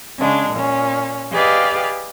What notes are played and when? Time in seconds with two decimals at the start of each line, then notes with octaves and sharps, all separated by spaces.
0.18 C#3 G#3 D4
0.51 A#2 C#4
1.32 G4 G#4 B4 D5 D#5 F5